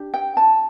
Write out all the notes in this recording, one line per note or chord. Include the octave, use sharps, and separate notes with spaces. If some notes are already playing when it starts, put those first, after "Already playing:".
Already playing: D4 G4
G5
A5